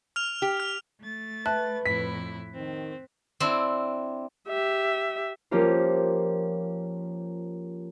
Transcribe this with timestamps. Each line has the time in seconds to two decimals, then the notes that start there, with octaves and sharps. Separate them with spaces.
0.16 F6 F7
0.42 G4
0.60 F6
1.02 A3 A6
1.46 B4 E5 A5 F#6
1.86 F2 A2 E4 B6
2.55 D#3 C4
3.40 C4 D4 E4
4.48 G4 E5
5.51 F3 A#3 C#4 F4 G4 C5